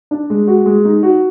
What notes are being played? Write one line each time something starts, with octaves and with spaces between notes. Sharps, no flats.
D4
G#3
F#4
G#3
D#4
F#4